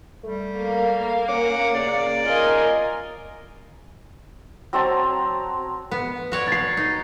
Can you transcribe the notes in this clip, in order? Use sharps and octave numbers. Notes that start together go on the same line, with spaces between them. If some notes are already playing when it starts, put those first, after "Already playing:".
G3 A3
A#3 F5
C#4 F#5 D6
C#3 D5
F4 A#4 D#5 G#5
F#3 C4 A5 A#5
B3
F#4 C#5 D5
A6 C7
D#4